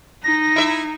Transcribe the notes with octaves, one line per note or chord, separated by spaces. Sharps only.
D#4 A#6
E4 E5